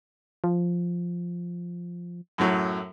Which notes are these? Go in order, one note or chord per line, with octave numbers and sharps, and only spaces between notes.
F3
F#2 A2 F#3